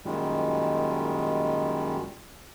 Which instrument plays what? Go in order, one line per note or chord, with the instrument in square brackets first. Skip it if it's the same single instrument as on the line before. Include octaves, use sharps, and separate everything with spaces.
[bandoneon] F#2 A#2 D#3 G3 G#3